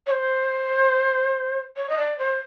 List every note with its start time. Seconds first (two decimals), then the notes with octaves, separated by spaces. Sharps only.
0.07 C#5
0.11 C5
1.77 C#5
1.89 D#5
1.98 D5
2.18 C5